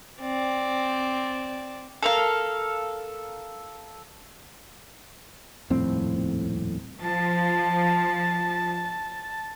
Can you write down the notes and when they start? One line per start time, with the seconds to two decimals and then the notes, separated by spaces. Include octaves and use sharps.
0.21 C4 D5
2.03 A4 A#4 F5
5.70 D#1 F2 A2 C4
7.01 F3 A5